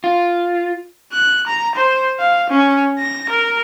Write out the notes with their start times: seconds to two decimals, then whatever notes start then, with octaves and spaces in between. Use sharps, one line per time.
0.04 F4
1.13 F#6
1.47 A#5
1.75 C5
2.19 F5
2.50 C#4
2.99 A#6
3.29 A#4